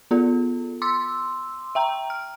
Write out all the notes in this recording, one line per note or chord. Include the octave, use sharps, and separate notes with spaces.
B3 F4 A4
C6 D6 E6
E5 G5 A#5
F6